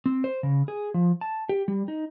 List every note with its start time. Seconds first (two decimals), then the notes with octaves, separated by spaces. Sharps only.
0.06 C4
0.24 C5
0.43 C#3
0.68 G#4
0.94 F3
1.21 A5
1.49 G4
1.68 G3
1.88 D#4